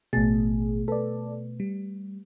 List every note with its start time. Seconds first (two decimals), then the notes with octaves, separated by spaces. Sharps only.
0.13 A1 B2 A3 G#4 A6
0.88 A4 B4 D5
1.60 G3